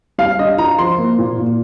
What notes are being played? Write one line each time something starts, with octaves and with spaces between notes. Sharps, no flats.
G3 F5
D4 D#5
F4 A#5
F3 C6
A#3
A#2
A#2